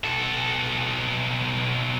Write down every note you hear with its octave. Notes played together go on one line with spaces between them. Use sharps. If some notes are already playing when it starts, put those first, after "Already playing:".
B1 A4